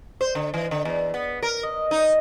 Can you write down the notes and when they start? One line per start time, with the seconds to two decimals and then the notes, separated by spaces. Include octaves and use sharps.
0.21 C5
0.35 D3
0.54 E3
0.71 D3
0.85 E2
1.14 B3
1.43 A#4
1.63 D#5
1.91 D#4